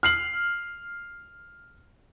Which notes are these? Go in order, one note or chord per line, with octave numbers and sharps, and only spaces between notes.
F6 C7 F#7